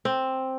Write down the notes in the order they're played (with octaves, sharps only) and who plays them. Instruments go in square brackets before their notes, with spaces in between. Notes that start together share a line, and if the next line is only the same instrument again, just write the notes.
[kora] C4